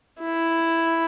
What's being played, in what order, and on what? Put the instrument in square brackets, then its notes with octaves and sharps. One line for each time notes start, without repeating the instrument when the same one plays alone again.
[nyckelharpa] E4